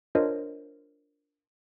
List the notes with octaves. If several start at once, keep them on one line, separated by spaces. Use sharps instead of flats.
D4 F4 A#4 C5 C#5 D#5